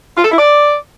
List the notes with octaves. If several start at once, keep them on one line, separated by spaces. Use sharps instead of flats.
F4
A4
E4
D5